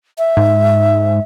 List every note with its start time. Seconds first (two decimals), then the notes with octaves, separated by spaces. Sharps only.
0.18 E5
0.37 G#2